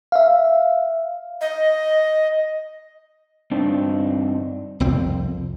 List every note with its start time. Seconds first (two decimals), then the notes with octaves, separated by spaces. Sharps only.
0.12 E5 F5
1.41 D#5
3.51 G2 C4 D4 D#4
4.80 C2 F2 C4